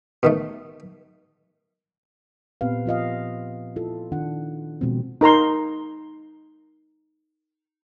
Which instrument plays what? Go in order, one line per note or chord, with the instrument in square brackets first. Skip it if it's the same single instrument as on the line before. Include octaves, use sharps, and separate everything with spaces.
[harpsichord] B2 D#3 A3
[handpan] A#2 B3 C4 G4 B4 F5
F3 F4 D#5 F5
E4 F4 A4
D#3 D4 F4 F#5
B2 F3 G#3 C4
[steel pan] D#4 A#4 A#5 C6